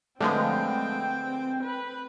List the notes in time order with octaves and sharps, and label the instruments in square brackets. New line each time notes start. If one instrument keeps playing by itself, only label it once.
[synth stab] D3 F3 G#3 [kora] A3 B4 [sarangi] C4 [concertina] G5
[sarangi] B4